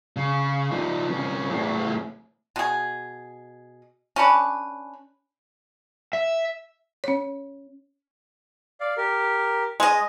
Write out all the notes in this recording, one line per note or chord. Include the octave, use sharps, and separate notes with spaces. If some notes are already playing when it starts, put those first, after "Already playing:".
C#3
F3 D#4
C2 C#4
E2 A2
B2 G#4
C#4 D4 B4
E5
C#4 C#5
D5 F5
G4 A#4
G#3 D#5